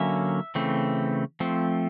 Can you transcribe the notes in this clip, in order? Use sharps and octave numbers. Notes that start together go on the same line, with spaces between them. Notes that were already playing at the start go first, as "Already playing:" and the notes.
Already playing: D3 F#3 A#3 C#4 E5
C#3 E3 A3 C4
F3 A3 C4